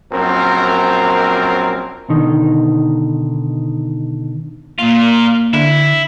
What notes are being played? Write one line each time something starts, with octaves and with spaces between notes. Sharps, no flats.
A#1 F#2 C4 A#4
B2 D3 D#3 D#4
A#2 A#3 F4
D3 E4